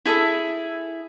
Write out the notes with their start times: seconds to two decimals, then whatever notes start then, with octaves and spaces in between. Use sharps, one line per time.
0.05 E4 G#4 A4 E5